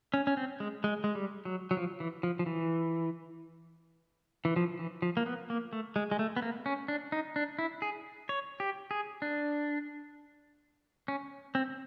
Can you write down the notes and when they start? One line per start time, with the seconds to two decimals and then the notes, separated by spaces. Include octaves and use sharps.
0.14 C#4
0.27 C#4
0.37 C4
0.60 G#3
0.84 G#3
1.04 G#3
1.15 G3
1.45 F#3
1.71 F#3
1.77 F3
2.00 E3
2.23 F3
2.39 F3
2.46 E3
4.45 E3
4.56 F3
4.79 E3
5.02 F3
5.17 A#3
5.26 B3
5.50 A#3
5.73 A3
5.96 G#3
6.11 G#3
6.19 A3
6.37 B3
6.42 A#3
6.66 C#4
6.88 D4
7.12 D#4
7.36 D4
7.59 E4
7.82 G#4
8.29 C#5
8.60 G4
8.91 G#4
9.22 D4
11.08 C#4
11.55 C4